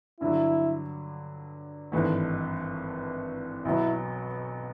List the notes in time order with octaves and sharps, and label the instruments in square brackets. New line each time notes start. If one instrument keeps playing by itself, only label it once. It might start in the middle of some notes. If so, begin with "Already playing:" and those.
[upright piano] G2 D3 F#3 [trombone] E4
[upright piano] G#1 G2 E3 A3 [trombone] D#4
[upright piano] B1 B2 F#3 B3 [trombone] E4